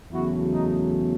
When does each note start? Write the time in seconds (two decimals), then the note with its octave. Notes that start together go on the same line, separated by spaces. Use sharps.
0.12 E2 C#3 F#3 A3 E4 F#4
0.52 D#4